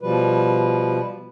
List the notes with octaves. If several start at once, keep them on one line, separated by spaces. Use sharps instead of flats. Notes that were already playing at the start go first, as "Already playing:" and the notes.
B2 F3 G3 B4